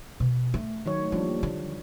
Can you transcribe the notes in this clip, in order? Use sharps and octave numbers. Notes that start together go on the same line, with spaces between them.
B2
A3
D#3 F#3 C#5
F3 G3 A#3 D4
D3